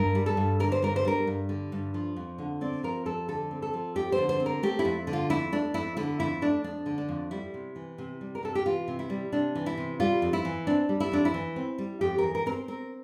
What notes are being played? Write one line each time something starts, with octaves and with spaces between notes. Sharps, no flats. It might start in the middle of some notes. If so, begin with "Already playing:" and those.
Already playing: G2 A#4
G3
A4
G2
D3 A#4
C5
G2 A#4
C5
G3 A#4
G2
D3
G2
F3
F2
D3
C4 D5
F3 A#4
F2 A4
D3 A4
C4
A4
F3
F2 G4
C5
D3
C5
C4
A#4
A3 G4
E4
F2
D3
F4
F2 E4
A3 D4
F2 E4
D3 E4
F2 E4
A3 D4
F2 D4
D3
D4
F2
G3 E4
C3
E3
C3
G3
A#4
C3 A4
G4
E3 F4
C3
E4
G3
C3 D4
E3
E4
C3
G3 F4
F2
E4
E3
C4 D4
G3
E4
F2 D4
E4
E3
C4
G3
F2 G4
A#4
E3
A#4
C4 A#4
C5
C4 A#4